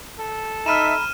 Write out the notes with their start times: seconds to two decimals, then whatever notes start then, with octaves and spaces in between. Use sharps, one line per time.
0.19 A4
0.66 D#4 E5 A#5 B5 F6 D#7 E7